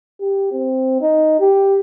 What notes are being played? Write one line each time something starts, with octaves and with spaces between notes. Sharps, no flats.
G4
C4
D#4
G4